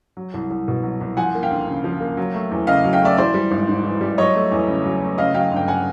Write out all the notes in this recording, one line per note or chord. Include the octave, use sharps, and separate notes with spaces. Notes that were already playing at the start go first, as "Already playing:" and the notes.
F#3
C2
C2
B2
F#3
C2
F3 F#5 G#5
A#3
F5 G5
D2
C#3
F3
A#3
F#3
A3
E2
C#3 D#5 F5
F#3
F5 G5
A3 D5 E5
E3 C5 D5
G3
G#1
G#2
E3
G3
F#3 C#5 D#5
A3
E2
C#3
F#3
A3
C#3 D#5 F5
F#3 F5 G5
G1
G5
F#5 G#5